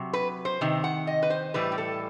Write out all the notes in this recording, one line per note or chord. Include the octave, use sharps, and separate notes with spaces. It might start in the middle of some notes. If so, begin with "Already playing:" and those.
Already playing: C3 F#3
B4
C5
C3 D#3
F#5
D#5
B4
C5
A2 E3 G3 B4
G4
A4